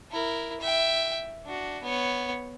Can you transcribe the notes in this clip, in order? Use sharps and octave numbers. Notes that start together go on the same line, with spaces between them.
E4 A#4
E5 G5
D4 F#4
B3 C#5